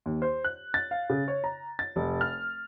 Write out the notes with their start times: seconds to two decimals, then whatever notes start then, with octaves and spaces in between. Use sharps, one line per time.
0.06 D#2
0.22 C5
0.44 F#6
0.74 A6
0.91 F5
1.10 C#3
1.28 C#5
1.44 A#5
1.79 A6
1.96 F1
2.21 F6